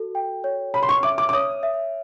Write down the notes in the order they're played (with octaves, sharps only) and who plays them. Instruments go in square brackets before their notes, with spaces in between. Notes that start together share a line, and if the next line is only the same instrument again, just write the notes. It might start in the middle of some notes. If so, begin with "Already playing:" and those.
Already playing: [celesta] F#4 A4
G5
C#5
[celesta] C#5 [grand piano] B5
[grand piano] C6
C#6
[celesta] E5 [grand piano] D6
[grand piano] D6
D6
[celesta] C#5 [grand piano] D#6
[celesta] E5